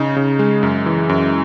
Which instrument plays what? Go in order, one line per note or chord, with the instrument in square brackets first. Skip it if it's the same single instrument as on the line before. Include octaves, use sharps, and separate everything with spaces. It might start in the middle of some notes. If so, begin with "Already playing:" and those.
Already playing: [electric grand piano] C#3 D#4
C#3
G#3
F#2
E3
F#2